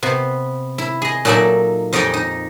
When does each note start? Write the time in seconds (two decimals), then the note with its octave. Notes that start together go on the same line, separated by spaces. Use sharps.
0.03 C3 B3
0.78 E4
1.02 G#4 D#5
1.25 A#2 F#3 D#4 A4 D5 E5
1.93 F2 D#4 G4 D5 G5 G#5
2.14 D#4